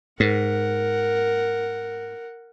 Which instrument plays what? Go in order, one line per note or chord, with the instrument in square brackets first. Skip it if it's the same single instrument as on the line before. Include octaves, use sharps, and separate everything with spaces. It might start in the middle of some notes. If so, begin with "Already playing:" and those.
[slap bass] G#2 [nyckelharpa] A#4 F#5